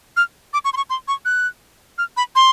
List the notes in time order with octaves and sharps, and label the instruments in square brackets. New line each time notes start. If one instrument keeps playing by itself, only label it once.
[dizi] F6
D6
C#6
C6
C#6
C6
C#6
F#6
F6
B5
C6